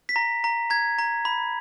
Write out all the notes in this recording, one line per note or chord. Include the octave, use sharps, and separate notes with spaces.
B6
A#5 A#6
A#5
A#5 G#6
A#5
B5